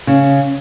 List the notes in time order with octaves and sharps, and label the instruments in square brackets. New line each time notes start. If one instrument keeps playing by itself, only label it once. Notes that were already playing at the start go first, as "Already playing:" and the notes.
[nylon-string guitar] C#3